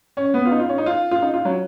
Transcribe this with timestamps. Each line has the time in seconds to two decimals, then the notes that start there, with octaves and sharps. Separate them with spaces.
0.17 C#4
0.34 B3
0.46 F4
0.52 D#4
0.60 F4
0.69 C#4
0.78 D#4
0.86 F4
1.11 F4
1.22 D#4
1.34 F4
1.45 F#3